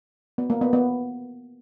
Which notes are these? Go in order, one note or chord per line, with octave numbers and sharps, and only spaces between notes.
B3
A#3
B3
B3